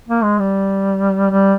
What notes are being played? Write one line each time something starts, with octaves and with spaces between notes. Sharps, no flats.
A#3
G#3
G3
G3